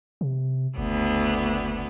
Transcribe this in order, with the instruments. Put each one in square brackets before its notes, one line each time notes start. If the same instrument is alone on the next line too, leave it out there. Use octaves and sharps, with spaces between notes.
[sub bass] C3
[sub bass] F#1 [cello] D2 B3